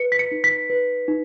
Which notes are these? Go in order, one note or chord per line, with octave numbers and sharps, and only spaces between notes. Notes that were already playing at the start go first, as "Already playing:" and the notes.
Already playing: B4 C#7
B6
C#7
D#4
B6
B4
D#4